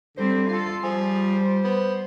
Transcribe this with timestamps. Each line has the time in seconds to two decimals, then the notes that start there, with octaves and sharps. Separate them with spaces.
0.17 D3 G3 C4 C5
0.49 F4 A4 C7
0.83 F3 G3 G#4
1.34 C5
1.64 B3